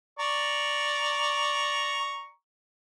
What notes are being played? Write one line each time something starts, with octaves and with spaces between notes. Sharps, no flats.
D5 A#5 C#6